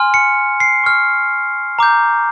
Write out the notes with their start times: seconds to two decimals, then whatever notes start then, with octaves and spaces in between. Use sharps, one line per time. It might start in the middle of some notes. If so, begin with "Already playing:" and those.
Already playing: G#5 C6 F6
0.14 C#7
0.60 C7
0.84 C#6 F6
1.79 A#5 D6 G6